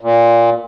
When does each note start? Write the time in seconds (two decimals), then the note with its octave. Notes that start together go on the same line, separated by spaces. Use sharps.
0.01 A#2